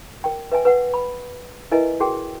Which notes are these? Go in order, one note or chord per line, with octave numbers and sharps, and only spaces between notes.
A#4 G5
B4 E5 G5 G#5
B4 F#5
B5
E4 A#4 B4 D#5 E5 G#5
F#4 G#4 A#4 G5